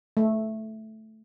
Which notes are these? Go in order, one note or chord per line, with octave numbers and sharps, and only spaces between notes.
A3